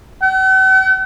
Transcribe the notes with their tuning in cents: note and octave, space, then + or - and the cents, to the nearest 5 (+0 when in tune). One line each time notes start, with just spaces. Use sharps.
F#5 +45